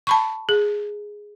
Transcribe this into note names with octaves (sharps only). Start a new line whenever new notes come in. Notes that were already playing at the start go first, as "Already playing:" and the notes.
A5 B5 C#6
G#4